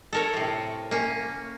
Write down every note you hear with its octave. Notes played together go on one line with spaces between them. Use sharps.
A4 A#4 C#5
A2 C3
A#3 C#4